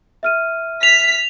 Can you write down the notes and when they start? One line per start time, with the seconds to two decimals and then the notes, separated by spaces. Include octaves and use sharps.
0.23 E5 F6 D#7
0.83 B6 F7